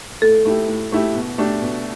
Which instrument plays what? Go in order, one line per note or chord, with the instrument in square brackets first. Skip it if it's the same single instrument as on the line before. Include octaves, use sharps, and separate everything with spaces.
[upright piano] A2 [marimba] A4
[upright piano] A3 E4 G4
A2
A3 E4 G4
B2
A3 D4 G4
B2